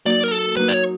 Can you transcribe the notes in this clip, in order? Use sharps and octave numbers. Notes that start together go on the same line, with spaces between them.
F#3 A#3 D#4 D5
A#4
A4
F#3 A#3 D#4 B4
D5
C#5